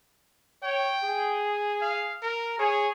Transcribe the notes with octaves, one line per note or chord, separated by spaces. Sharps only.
C#5 G5
G#4
F5
A#4
G#4 C#5